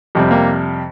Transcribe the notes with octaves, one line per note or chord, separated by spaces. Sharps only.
F2 C3 G3
A#3